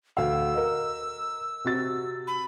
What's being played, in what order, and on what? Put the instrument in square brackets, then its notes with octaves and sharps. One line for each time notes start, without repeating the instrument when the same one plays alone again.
[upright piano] D2 F5 [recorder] E6
[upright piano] A#4 D#5
C3 F#4 A6
[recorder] B5